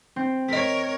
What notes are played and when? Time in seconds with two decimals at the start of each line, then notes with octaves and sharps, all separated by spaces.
0.16 C4
0.49 A#4 C#5 D#5 B6